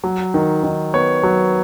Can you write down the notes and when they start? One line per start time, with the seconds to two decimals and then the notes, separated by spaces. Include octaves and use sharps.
0.04 F#3
0.34 D#3
0.63 D#3
0.94 B3 C#5
1.23 F#3